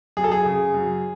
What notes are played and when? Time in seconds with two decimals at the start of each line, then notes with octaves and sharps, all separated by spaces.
0.17 F#2 G#4
0.24 A4
0.32 G#4
0.45 C#3
0.74 F#2